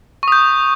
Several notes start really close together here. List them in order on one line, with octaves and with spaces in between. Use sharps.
C#6 D#6 G6